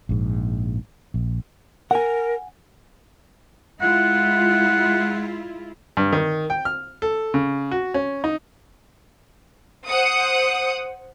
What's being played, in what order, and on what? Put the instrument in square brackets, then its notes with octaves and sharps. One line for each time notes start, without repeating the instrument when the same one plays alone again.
[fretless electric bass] A#1 G#2
A#1
[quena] A#4 [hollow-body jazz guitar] F#5 G#5
[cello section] G#3 E4 F4 [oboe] F#5
[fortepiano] G2
D#3
G5
F6
A4
C#3
F#4
C#4
D#4
[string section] C5 F#5 D#6